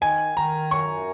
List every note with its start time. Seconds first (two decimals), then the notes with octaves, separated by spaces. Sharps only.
0.02 D#3 G#5
0.36 D#3 A#5
0.71 F#2 C#6